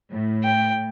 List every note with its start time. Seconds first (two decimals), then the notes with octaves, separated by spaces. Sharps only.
0.11 A2
0.44 G5